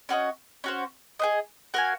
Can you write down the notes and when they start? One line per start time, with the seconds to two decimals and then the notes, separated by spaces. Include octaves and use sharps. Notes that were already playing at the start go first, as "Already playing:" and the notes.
0.09 C#4 F#4 C5 D#5
0.64 C#4 F#4 C5
1.19 G#4 C5 D#5
1.74 F#4 A#4 F5 G#5